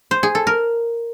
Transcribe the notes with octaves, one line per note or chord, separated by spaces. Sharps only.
C5
G#4
A4
A#4